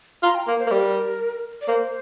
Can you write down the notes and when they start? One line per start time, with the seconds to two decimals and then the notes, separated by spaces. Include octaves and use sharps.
0.23 F4 A#5
0.35 G5
0.47 A#3 A#4
0.59 C5
0.67 A#3
0.71 G3 A#4
1.61 D5
1.68 A#3 C5